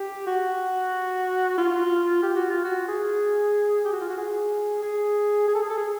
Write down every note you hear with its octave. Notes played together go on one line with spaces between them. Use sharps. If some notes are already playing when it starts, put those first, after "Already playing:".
Already playing: G4
F#4
F4
G4
F#4
F4
F#4
G#4
G4
F#4
F4
F#4
G#4
G#4
G#4
A4
G#4
A4
G#4